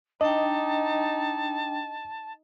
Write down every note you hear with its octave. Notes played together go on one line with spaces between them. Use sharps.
D4 D#4 D#5 G5 A5